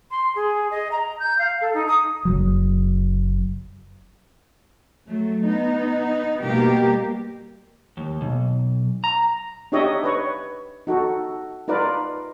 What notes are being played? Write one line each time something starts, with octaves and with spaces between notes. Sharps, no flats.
C6
G#4
D#5
A#5
G6
F5
A4
D#4
D#6
F#1 F#3
F#3 A3
B3 D#4
B2 G3 A#3 G4 A#4
D#2
B1
A#5
D4 D#4 G4 C#5 D#5 E5
B4 C#5
D#4 F#4 A4
D#4 F4 A#4 B4 D5